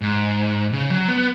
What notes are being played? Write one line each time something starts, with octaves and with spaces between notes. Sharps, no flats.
G#2
C#3
F#3
B3